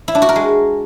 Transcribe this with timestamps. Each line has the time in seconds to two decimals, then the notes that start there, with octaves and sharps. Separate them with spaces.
0.08 E4
0.15 D4
0.22 F#4
0.29 A#4
0.36 G#3